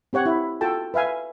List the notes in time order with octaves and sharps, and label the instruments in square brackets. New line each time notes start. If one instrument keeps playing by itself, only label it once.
[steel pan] C4 G4 C#5 F#5
E4
F4 F#4 A4 G5 A5
B4 E5 F5 G#5